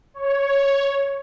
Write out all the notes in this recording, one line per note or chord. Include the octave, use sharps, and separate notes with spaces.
C#5